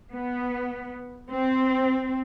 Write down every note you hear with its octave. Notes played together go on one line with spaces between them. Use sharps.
B3
C4